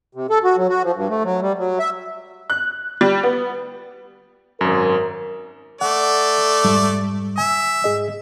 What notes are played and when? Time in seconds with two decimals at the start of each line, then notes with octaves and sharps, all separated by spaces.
0.15 C3
0.30 A4
0.44 F#4
0.57 F#3
0.70 F#4
0.84 F3
0.95 G2
1.10 A3
1.24 F#3
1.42 G3
1.58 F#3
1.79 E5
2.50 F#6
3.01 G3
3.23 B3
4.61 G#1 F#2 A#4
5.81 A3 D5 F#5
6.64 F2 G#2 G3
7.38 E5 G#5
7.84 G#2 G#4 D#5